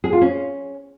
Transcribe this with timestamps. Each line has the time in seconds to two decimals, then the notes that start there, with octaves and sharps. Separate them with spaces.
0.04 G#4
0.13 F4
0.22 C#4